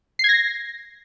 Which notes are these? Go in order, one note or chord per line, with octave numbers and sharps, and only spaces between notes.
G#6 A#6 C7